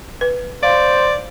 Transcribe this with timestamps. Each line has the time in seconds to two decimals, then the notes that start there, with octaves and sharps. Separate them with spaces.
0.21 B4
0.63 C5 D5 F5